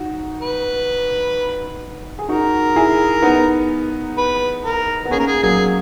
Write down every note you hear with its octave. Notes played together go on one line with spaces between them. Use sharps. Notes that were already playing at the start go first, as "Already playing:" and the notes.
Already playing: D#4 F#4
B4
G#4
D#4 F#4 A#4
E4 G#4
B3 D#4
B4
A#4
B3
A#3 C#4 G#4
A#4
G#4
F#3 A#3 G#4